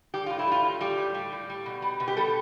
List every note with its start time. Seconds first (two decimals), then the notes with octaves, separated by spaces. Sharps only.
0.14 G3 G4
0.26 A2 F4
0.39 E4
0.48 G3 F4
0.64 A2
0.81 G3 G4
0.98 A2
1.14 G3
1.32 A2
1.50 G3
1.66 B2
1.82 G3
2.00 B2
2.08 G4
2.17 G3 A4